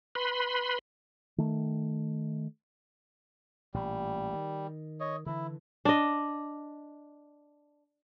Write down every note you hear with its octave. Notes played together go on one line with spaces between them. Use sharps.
B4 B5 C6
D#3 A3
A1 A#2 G3
D#3
C#5 D#5
D3 E3 E4
D4 D#5